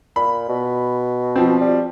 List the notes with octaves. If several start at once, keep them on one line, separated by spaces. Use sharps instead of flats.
A#2 B5
B2
F3 C4
G3